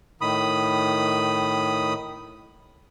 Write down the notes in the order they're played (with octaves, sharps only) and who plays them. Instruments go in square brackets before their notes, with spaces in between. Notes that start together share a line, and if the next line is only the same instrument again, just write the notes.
[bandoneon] A2 D#3 B5 D#6